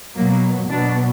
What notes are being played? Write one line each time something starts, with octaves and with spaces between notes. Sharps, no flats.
B2 F#3 A#3
B2 F#3 D4